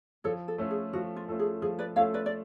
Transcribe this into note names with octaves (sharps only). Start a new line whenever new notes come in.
F3 A4 C#5
A4
A3 C#4 F4 A4
G#4
F3 F#4
F4
A3 C#4 F4 A4
G#4
F3 G#4
B4 D5
A3 C#4 F4 A4 C#5 F5
B4 D5
D5